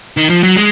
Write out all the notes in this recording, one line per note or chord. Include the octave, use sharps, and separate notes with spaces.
D#3
F3
F#3
G#3